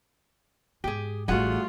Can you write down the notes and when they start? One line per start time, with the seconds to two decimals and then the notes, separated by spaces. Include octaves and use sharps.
0.84 G#2 G4 G#4
1.28 A1 E3 G3 A3 F4 F#4 G#4 F#5